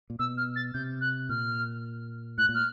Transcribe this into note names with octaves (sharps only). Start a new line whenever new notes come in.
A#2
B2 E6
F6
A6
C3 G6
F#6
A#2 F6
A2 F#6
A#2
F6